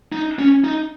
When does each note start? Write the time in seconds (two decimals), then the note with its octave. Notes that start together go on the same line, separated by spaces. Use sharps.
0.12 D#4
0.39 C#4
0.64 D#4